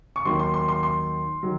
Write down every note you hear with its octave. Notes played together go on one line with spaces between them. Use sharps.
C#6
D#2 D#3 F#3 C6
C6
C6
C6
C6
D#3 F#3